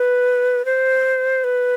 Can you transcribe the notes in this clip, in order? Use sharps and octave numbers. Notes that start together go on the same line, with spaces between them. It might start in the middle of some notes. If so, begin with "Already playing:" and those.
Already playing: B4
C5
B4